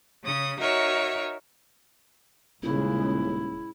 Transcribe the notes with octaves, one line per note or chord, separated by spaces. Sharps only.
C#3 C#4 D#6
D#4 F#4 A#4 C#5 E5
D#1 A#2 C#3 G#3 E4